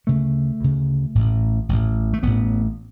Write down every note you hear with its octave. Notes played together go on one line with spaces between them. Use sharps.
D2 C#3 A3
D2 C#3
A1 A2
A1 A2
A3
A1 A2 B3